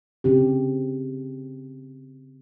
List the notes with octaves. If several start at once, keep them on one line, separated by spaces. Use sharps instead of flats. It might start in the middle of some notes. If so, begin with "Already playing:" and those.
C#3 C4 G4